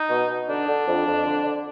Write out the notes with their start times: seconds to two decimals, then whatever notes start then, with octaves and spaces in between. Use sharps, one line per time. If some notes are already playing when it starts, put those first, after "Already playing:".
Already playing: D#4
0.09 B2
0.29 B2
0.48 D3 D4
0.68 D3
0.87 F2
1.07 F2
1.26 D3
1.45 D3